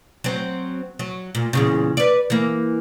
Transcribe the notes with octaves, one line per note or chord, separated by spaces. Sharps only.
F#3 C4
F#3
A#2
E2 A#2 C#3
B4 D5
E3 A#3